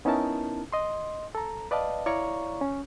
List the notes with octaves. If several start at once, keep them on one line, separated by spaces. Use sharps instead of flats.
B3 C#4 D#4 E4 A#4 A5
D#5 C6
A4 A#5
B4 D5 D#5 F5 A5
E4 C#5 D5 F5 A#5 C#6
C#4